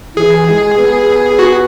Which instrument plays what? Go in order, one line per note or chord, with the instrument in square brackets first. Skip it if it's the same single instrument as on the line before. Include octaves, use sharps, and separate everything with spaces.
[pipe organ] E3 [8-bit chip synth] G#4
[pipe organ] G#3
B3
[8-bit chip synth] F#4